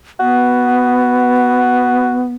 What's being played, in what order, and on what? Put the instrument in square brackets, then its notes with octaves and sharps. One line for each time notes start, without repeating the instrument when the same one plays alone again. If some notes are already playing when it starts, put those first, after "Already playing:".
[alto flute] B3 [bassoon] F#4